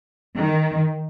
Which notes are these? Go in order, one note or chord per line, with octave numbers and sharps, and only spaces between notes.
D#3